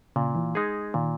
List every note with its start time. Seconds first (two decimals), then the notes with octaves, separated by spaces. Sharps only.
0.16 A#2 C#3
0.35 E3
0.55 G#3 D#4 G#4
0.94 A#2 D#3